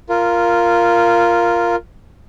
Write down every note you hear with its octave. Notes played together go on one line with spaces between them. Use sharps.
F4 A#4